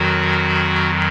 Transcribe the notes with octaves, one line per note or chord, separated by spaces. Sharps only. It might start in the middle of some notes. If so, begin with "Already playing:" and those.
Already playing: F2 D#3 F#3 F#4